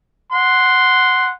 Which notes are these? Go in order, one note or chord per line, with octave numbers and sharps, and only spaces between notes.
F#5 C6